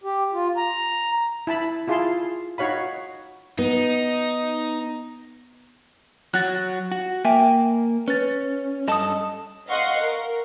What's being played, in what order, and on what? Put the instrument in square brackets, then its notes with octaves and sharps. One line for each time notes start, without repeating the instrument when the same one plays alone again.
[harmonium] G4
F4
A#5
[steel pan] E4 A5 B5
E4 F4 G#4 F5 A5 C6
D#4 F#4 C#5 F5 B5
[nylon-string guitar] B3 [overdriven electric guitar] D#4
[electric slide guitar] F#3 F#4 [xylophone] F#6 A6
[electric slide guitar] F#4
[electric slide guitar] A#3 [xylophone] E5 G5 G#5
[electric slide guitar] C#4 [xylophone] B4 A6
[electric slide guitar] G2 A4 A5 [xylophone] D#5 D#6
[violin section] D#5 F5 F#5 C6 C#6
A#4